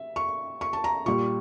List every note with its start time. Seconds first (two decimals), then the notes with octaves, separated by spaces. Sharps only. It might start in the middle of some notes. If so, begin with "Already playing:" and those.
Already playing: E5
0.16 C#6
0.61 C#6
0.73 A5
0.84 A#5
1.06 A#2 G3 C#6